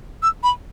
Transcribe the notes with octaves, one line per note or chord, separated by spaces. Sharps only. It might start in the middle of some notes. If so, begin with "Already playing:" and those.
E6
B5